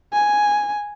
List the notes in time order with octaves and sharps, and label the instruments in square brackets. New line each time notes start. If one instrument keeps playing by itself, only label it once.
[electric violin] G#5